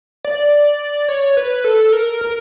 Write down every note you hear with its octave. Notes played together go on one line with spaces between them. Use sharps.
D5
C#5
B4
A4
A#4
A#4